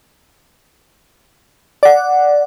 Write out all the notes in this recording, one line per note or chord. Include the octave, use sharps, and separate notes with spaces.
D5 F#5